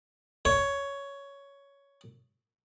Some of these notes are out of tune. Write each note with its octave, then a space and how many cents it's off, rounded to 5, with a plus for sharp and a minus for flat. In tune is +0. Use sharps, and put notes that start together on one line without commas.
C#5 +10